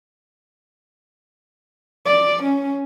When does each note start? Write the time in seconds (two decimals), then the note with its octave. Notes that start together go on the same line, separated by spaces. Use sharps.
2.06 D5
2.43 C#4